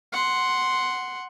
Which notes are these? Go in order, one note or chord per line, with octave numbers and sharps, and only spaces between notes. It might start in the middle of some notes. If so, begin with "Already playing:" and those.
F#5 C6